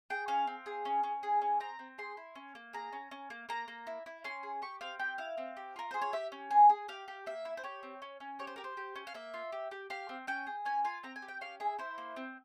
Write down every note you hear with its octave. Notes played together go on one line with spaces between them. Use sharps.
G#4 G5
C#4 F5
C4
G#4
C#4
C#4
G#4
C#4
C4 A#5
C4
G#4 C6
E4
C#4
A#3
G#4 A#5
C#4
C#4
A#3
A#3 A#5
A#3
E4
E4
C#4 C6
G#4
G4 C#6
C4 F5
G4 G5
E4 F5
C4
G4
F4 A#4
G#4 C5
C#5
G4 E5
C#4
G#4
G#4
G4 F5
G4
A#3 E5
E4
C5
G4 C#5
C4
C#4
C#4
G4 C#5
C5
G4 A#4
C5
G4
C#4
F5
A#3 E5
F4
G4
G4
G4 F5
C4
C#4 G5
G#4
C#4 G#5
F4 G#5
C4 A#5
G#5
G4
G5
C#4 F5
G#4 E5
E4 C5
A#3
C4